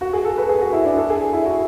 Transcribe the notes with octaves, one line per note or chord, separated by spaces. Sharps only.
F#4
G#4
A4
B4
G#4
F#4
E4
D4
A4
G#4
E4
F#4